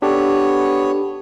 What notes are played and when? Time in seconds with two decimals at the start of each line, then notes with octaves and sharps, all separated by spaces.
0.02 B3 D4 G4 A4 C#5